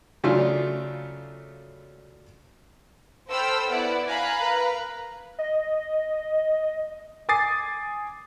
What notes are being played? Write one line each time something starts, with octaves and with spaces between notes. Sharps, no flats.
C#3 F#3 A3 D4 F4
A4 C5 G5 B5 E6 F6
B3 E4 D5 F#5
F5 G#5 A#5 B5 F#6
A#4 B4 A#5
D#5
G#5 D6 D#6 A6 C7